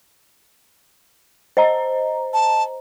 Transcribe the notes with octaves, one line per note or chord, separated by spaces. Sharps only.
C5 D#5 A#5
A5